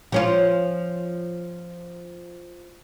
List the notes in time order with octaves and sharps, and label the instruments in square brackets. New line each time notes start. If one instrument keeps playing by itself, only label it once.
[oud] F3 C#4 F4